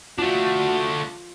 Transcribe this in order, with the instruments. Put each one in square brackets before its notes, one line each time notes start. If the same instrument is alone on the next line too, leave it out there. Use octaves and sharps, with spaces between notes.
[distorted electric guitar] A3 D4 [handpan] F4 [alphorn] F#4